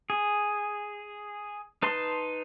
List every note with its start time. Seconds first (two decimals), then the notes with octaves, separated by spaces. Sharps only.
0.10 G#4
1.83 D#4 B4 A5 C6